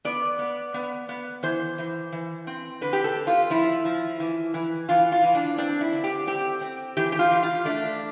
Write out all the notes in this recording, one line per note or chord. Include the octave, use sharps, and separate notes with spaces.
B3 D5
B3
B3
B3
E3 C5
E3
E3
C4
D3 B4
G4
A4
C4
F4
F3 E4
F3
E3
E3
E3 F4
F4
E3
D4
C4 D4
E4
D3
G4
C4 G4
C4
E3 G4
G4
F4
E3
F4
A3 D4